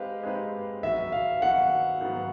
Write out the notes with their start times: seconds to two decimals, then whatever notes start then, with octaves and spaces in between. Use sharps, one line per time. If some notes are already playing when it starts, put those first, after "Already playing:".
Already playing: G#3 C4 D#4 G4 B4 F5
0.23 G#3 C4 D#4 G4 B4
0.83 D#3 F#3 B3 E5
1.12 F5
1.42 D#3 F#3 B3 F#5
2.01 G#2 D#3 F#3 B3